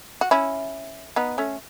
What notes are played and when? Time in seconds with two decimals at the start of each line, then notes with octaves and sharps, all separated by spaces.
0.21 F#4
0.31 C#4 E4
1.16 B3 D#4
1.38 A3 C#4